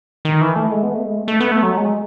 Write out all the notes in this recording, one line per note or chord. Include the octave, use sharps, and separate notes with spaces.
D#3
E3
A3
G#3
B3
A3
G#3
A3
A3
B3
A3
F#3
G#3